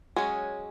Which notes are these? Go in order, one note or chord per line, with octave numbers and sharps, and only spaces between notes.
F#3 G#3 C#4 G#4